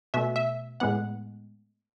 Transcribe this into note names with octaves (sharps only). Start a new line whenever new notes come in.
B2 A3 E5
E5
A2 G#3 B3 F#5